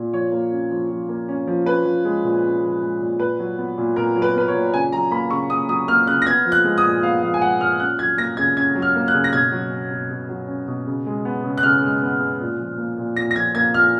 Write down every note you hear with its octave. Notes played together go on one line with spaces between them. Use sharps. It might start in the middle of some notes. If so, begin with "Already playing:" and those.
Already playing: A#2
F3 C#5
A#3
C#4
F3
F3
A#3
C#4
F3
C#4 B4
F3
G#3
A#2
C#4
F3
G#3
A#2
A#2 B4
F#3
B3
A#2
A#2 A#4
F#3
B4
B3 B4
C#5
A#2
C#3 G#5
F#3 A#5
A#3 B5
C#3 C#6
C#3 D#6
F#3 D#6
A#3 F6
C#3 F#6
A#6
B3 G#6
F3
F#6
G#3
D#6
A#2
B3 F5
F3 F5
G#5
G#3 F#5
A#2 F6
C#4 F#6
F#3 G#6
A#3 A#6
C#3 G#6
C#4 G#6
F#3
F6
A#3
F#6
C#3
A#6
B2 G#6
F#3
C#4
B2
B2
F#3
C#4
B2
C#3
G#3
B3
C#3
F#6
C#3 F6
G#3
B3
C#3
A#2
F3
A#3
A#2
A#2 A#6
A#6
F3 G#6
A#3 G#6
A#2 F6